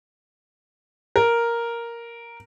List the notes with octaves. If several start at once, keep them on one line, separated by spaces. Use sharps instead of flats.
A#4